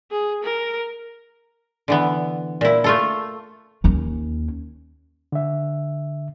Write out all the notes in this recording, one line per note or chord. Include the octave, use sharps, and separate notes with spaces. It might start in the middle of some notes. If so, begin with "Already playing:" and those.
G#4
A#4
D3 E3 B3
A#2 E4
A3 F4 A4
D#2 C#4
D3 E5